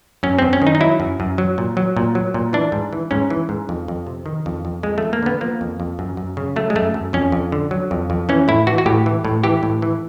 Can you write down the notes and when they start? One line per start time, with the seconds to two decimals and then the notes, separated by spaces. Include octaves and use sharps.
0.23 F#2 C#4
0.39 F#2 C4
0.53 C#4
0.62 D#3 D#4
0.75 D#4
0.80 F#3 E4
1.00 F#2
1.20 F#2
1.38 F#3
1.58 A#2
1.77 F#3
1.96 A#2
2.15 F#3
2.34 A#2
2.53 E3 D4
2.72 G#2
2.93 E3
3.11 G#2 C#4
3.30 E3
3.49 G#2
3.69 F2
3.88 F2
4.07 C3
4.26 D#3
4.46 F2
4.65 F2
4.83 F2 G#3
4.98 F2 A3
5.13 A#3
5.23 D3 B3
5.41 F3 A#3
5.61 F2
5.80 F2
5.99 F#2
6.17 F#2
6.37 C#3
6.56 F#3 A3
6.70 G#3
6.76 F#2 A3
6.94 F#2
7.13 F2 C#4
7.32 F2
7.52 D3
7.71 F#3
7.91 F2
8.10 F2
8.29 E3 C#4
8.48 A2 E4
8.67 E3 F#4
8.78 F#4
8.86 A2 G4
9.06 E3
9.25 A2
9.44 E3 G4
9.63 A2
9.82 E3